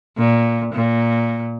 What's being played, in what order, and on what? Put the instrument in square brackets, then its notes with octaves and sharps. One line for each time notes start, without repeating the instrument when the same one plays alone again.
[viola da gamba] A#2
A#2